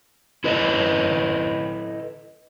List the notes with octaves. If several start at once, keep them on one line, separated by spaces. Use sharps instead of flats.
E4 A4 B4 D#5